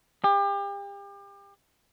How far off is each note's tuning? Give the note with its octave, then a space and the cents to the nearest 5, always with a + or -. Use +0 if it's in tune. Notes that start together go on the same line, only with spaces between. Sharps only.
G4 +35